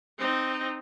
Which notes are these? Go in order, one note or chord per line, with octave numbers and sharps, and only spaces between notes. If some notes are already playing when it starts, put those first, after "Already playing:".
C4 D#4